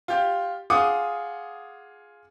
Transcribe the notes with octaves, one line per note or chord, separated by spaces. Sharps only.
F4 G4
F4 G#4 F#5 D6 D#6